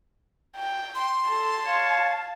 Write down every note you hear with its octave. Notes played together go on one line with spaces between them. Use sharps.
G5
C6
A4 A5
C#5 F5